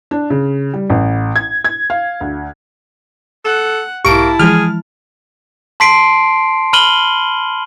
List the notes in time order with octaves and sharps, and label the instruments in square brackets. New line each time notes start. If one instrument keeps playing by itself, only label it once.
[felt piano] D4
C#3
G3
A1
G#6
G#6
F5
D2
[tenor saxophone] A4 [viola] F#5 [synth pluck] F#6 E7
[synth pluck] B1 G#2 G4 [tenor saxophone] A#3 [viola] E4 A5 [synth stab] C#6 D7
[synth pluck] E3 F3 G#3 [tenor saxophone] G#4 [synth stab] F6
[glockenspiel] A5 C6 B6 C7 D7
B5 F6 D#7 F#7 G7